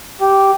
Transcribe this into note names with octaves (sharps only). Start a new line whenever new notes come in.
G4